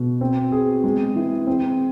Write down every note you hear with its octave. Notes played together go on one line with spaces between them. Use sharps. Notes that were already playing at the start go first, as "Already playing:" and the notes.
Already playing: B2
C4
G#4
G#3
E3
C4